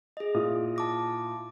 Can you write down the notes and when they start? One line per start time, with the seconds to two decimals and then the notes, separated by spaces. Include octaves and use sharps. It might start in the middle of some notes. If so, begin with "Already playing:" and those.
0.17 G#4 D#5
0.34 A#2 E4 D#6
0.76 A5 D6 A#6